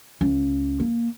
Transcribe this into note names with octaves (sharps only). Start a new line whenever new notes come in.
C#2
A#3